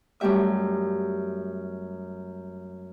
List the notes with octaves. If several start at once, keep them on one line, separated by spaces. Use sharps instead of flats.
F#2 G3 A3 G4 E5 E6